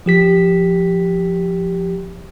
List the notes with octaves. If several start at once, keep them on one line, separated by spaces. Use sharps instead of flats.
F3 G4 B6